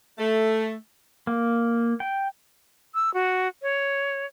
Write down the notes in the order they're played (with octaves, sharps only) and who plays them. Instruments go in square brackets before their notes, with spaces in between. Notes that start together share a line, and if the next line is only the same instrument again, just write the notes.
[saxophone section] A3
[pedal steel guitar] A#3
G5
[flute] E6
F#4
C#5